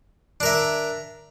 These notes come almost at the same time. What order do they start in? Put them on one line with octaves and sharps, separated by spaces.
D4 A#4 E5